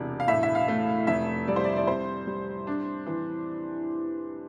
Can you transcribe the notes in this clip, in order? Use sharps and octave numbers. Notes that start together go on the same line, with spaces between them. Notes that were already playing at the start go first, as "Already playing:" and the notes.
Already playing: E1 C3 D5
F5
A2 E5
E5
F5
A3
F1 E5
G3 D5
C5
D5
D5
C4 C5
G3
D4
E3